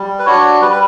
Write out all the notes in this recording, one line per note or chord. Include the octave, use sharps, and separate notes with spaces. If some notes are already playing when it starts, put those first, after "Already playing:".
Already playing: G3
B4
D4 F#4 C#5
G3 B4
B4